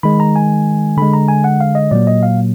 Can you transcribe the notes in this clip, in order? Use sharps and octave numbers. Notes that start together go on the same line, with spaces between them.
D#3 G#3 B5
A#5
G#5
D3 G#3 B5
A#5
G#5
F#5
F5
D#5
A#2 F#3 A#3 D5
D#5
F5